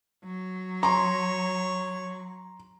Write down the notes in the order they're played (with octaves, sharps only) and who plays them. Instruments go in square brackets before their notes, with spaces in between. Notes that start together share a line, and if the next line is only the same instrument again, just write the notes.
[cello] F#3
[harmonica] C#5 [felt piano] A#5 C6